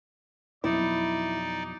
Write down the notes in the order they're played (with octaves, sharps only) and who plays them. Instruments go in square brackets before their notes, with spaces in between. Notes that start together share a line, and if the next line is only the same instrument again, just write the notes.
[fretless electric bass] F2 B2 F#3 [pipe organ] D#4 D5 [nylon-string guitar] E4